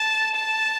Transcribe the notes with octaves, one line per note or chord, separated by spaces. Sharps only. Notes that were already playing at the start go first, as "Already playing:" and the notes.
Already playing: A5
A5